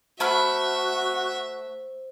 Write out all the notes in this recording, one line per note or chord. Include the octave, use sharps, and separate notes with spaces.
A3 F#4 C5 E5 B5 F6